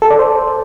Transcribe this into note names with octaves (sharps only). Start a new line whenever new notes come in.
A4
D5
C5